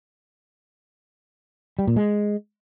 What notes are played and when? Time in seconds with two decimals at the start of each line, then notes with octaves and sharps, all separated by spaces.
1.79 G3
1.87 A#2
1.96 G#3